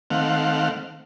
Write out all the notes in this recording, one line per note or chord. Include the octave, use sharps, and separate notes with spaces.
D#3 A3 C4 F5 F#5